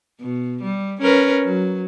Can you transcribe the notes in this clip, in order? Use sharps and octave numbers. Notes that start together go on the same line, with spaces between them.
B2
G3
C#4 A#4 B4
F#3